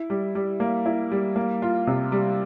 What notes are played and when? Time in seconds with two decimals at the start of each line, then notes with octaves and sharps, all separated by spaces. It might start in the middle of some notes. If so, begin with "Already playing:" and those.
Already playing: E4
0.10 G3
0.35 G3
0.60 A#3
0.86 E4
1.12 G3
1.36 A#3
1.62 F4
1.87 C3
2.12 G3